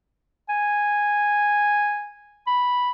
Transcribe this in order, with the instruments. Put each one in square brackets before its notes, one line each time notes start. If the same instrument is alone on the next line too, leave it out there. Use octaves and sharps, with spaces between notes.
[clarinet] G#5
B5